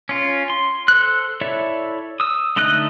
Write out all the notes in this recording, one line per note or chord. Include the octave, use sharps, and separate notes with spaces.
C#4 F4
C6
A4 C5 F#6
E4 A4 C#5 D5 E5
D#6 E6
D3 A3 D#4 D#5 F#6